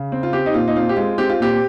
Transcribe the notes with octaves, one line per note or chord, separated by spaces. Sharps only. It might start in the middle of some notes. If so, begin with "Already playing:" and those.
Already playing: C#3
C4
F4
C4 G4
D#4
A#2 F4
D#4
C4 F4
G4
G#3 F4
C4 G4
F4
A#2 G4